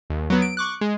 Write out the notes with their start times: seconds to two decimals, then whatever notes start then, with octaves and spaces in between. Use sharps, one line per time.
0.10 D#2
0.30 F#3 B3
0.42 D7
0.57 C#6 D6 F#6
0.81 G#3